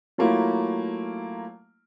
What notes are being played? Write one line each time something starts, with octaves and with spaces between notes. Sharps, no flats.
F#3 A3 A#3 E4 F4